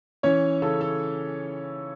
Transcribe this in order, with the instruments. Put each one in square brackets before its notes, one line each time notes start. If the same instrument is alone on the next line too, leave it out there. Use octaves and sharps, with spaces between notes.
[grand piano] E3 C#4 C#5
C#3 A4
A4